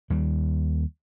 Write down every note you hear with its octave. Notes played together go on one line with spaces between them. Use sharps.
D#2 G3